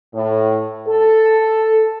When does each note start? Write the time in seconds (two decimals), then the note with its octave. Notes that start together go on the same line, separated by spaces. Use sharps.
0.14 A2
0.88 A4